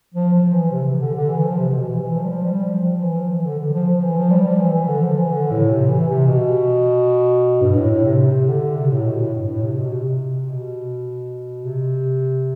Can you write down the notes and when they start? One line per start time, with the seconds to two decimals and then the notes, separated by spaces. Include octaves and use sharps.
0.14 F3
0.33 F3
0.52 E3
0.71 C3
0.86 C3
1.00 D3
1.14 D3
1.29 E3
1.44 F3
1.58 C3
1.73 B2
1.86 E3
2.01 E3
2.15 F3
2.24 G3
2.30 F3
2.44 G3
2.63 F3
2.83 F3
3.02 E3
3.16 F3
3.30 E3
3.45 D3
3.59 D3
3.73 F3
3.87 F3
4.02 E3
4.17 F3
4.31 G3
4.45 F3
4.60 E3
4.74 E3
4.88 D3
5.03 F3
5.17 E3
5.31 D3
5.51 A2
5.70 C3
5.89 E3
6.08 C3
6.27 B2
7.61 G2
7.76 A2
7.90 A2
8.04 C3
8.19 C3
8.48 D3
8.76 C3
8.91 A2
9.05 B2
9.20 A2
9.34 G2
9.48 A2
9.63 C3
9.77 B2
9.92 C3
10.48 B2
11.64 C3